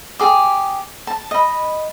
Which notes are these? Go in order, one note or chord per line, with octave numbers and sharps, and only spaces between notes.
G4 G#4 D6
A5
D#5 B5